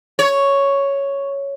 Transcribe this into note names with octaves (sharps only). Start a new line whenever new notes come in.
C#5